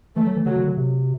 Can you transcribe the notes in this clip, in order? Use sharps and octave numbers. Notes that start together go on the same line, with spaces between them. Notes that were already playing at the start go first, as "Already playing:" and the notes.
E3 A3
F#3
E3
D3 F#3
D3
D3
C3